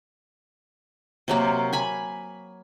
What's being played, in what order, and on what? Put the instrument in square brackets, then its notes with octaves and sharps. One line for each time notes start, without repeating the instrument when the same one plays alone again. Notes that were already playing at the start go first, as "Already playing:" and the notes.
[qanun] C3 F#3 A#3
G#5 B5